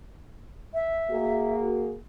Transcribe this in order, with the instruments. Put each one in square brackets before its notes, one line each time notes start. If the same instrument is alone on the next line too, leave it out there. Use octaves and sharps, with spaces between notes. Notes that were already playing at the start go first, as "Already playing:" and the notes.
[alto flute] E5
[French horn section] A#3 F#4 G#4